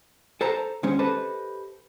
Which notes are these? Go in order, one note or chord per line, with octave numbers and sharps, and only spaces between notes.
A4 C5 A5 A#5
D#2 G#3 C#4 C5
G4 A4 B4 C5 D#5